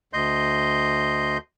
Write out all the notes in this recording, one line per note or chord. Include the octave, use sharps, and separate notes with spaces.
D2 D#5 C6 G6